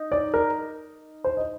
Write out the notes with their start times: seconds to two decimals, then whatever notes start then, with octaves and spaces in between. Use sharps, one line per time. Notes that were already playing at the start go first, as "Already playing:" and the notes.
Already playing: D#4
0.12 D5
0.34 A#4
1.24 C5
1.37 D#5